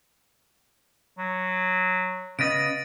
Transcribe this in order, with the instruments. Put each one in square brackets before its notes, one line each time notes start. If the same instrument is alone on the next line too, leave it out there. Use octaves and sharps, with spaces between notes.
[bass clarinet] F#3
[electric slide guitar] C#3 B3 D#5 [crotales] A6 D7